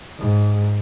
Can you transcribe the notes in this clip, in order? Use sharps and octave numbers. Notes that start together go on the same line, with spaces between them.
G#2